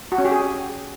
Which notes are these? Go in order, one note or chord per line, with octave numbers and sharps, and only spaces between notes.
F#4
C#4
G4
G#4